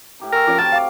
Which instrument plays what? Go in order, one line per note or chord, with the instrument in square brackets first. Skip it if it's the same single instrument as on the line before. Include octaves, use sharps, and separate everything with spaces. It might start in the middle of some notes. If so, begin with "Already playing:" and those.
[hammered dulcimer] A2 G4 A#5
[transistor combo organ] A#4 [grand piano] G#5 C#6 E6
[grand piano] F3 C#4 [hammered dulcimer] F5 D6
[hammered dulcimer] F#3 C4 [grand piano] G5 A#5 F6 [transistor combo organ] A5
[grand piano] F5 D6